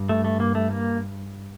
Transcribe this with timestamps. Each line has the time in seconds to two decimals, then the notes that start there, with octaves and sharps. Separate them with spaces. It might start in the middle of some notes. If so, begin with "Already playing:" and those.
Already playing: G2
0.09 A3
0.24 A3
0.40 A#3
0.55 A3
0.71 A#3